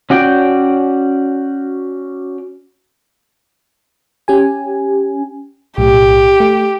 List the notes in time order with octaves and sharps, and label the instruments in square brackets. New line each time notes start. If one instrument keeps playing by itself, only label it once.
[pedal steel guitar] C#4 F#4 D5 G5
[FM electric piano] C#4 G4 G#5
[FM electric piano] B1 A2 [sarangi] G4
[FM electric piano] A3